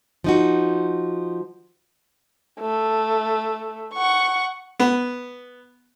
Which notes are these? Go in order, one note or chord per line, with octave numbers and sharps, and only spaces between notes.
F3 D#4 F#4
A3
F#5 C#6
B3